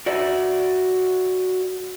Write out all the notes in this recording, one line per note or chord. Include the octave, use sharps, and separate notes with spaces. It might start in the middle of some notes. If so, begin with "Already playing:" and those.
F#4 D5 E5